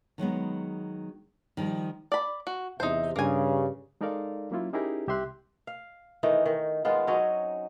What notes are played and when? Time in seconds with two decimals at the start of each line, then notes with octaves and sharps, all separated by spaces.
0.18 D#3 F#3 G#3 B3
1.57 D#3 F3 G3
2.12 D5 B5
2.47 F#4
2.80 E2 C3 D#4 C5 E5
3.16 G2 C#3 A#3 G#5
4.01 G#3 D#4 A4 A#4 D5 F5
4.51 F#3 A#3 C#4 E4 F4
4.73 C#4 D#4 E4 G4 G#4 A#4
5.07 C2 G4 E5 C6 F#6
5.67 F5
6.23 D#3 E3 A3 D#4
6.46 D#3
6.85 D#3 G#3 B3 F4
7.07 F#3 C4 C#4 D#4